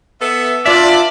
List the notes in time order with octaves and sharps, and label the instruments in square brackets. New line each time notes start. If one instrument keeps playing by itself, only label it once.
[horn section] B3 A4 E5
[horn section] D4 B4 D5 [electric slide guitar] F4 E5